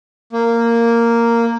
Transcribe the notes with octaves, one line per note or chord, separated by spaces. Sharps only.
A#3